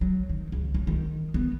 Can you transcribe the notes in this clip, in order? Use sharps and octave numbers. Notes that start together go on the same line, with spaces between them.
F#3
D#3
C#2
A#3
D#3
B3